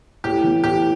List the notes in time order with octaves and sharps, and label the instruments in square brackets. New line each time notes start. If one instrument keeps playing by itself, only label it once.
[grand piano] A2 [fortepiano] G4
[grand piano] E3 B3 E4
[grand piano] A2 [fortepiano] G4